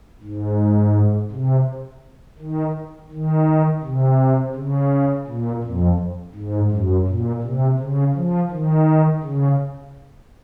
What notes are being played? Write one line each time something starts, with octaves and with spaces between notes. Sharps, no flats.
G#2
C3
D#3
D#3
C3
C#3
A#2
F2
G#2
F#2
A#2
C3
C#3
F3
D#3
C#3